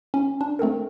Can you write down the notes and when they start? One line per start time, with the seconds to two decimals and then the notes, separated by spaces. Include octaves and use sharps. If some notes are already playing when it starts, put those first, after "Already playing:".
0.14 C#4
0.41 D4
0.59 A3 C4 A4 A#4